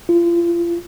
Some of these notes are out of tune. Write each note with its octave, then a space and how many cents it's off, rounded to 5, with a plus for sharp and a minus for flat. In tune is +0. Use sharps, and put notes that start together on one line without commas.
F4 -35